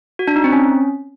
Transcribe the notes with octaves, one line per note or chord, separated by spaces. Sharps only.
F#4
D4
D#4
C4
C#4